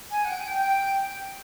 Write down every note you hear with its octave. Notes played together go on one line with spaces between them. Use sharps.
G#5
F#5
G5